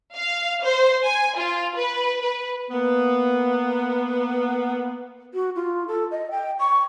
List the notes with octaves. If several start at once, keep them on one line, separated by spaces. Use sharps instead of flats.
F5
C5
G#5
F4
B4
B4
A#3 B3
F#4
F4
A4
D#5
G5
C#6